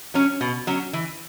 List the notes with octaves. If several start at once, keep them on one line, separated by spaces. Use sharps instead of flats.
F#3 C#4
B2
F#3 C#4
E3